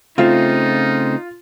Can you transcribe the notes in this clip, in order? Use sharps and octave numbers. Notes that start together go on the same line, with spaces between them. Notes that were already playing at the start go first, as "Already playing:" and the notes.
C#3 A3 C4 D#4 F4